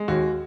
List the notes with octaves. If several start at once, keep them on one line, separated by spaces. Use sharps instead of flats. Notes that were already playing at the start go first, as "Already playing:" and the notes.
Already playing: G#3
D#2 F#4